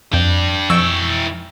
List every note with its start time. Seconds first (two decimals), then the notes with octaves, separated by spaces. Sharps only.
0.13 F2 D4 G5
0.70 F2 E3 G5 C#6 E6